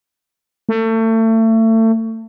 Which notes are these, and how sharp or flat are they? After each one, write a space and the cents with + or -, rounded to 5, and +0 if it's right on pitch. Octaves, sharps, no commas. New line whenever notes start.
A3 +30